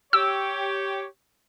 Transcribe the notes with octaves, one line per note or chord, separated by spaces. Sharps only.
G4 C#5 E6